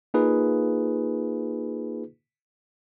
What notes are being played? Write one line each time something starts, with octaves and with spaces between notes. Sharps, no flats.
A#3 D#4 F4 G#4 B4